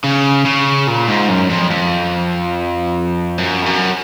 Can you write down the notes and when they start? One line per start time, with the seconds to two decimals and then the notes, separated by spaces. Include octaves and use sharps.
0.04 C#3
0.45 C#3
0.87 A#2
1.08 G#2
1.29 F#2
1.50 F2
1.71 F2
3.38 F#2
3.62 F2
3.66 F#2